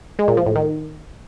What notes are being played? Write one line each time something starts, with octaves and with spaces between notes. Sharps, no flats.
G#3
A#2
F3
A2
D#3